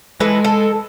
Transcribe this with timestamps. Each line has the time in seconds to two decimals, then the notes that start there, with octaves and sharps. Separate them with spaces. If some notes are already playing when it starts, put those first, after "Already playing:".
0.20 E3 G#3 A4 B4
0.44 A4